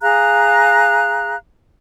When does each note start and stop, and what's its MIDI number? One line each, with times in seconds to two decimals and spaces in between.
0.01 1.35 68
0.01 1.35 77
0.01 1.35 82
0.01 1.35 90